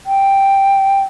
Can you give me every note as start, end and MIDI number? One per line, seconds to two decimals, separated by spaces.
0.06 1.01 79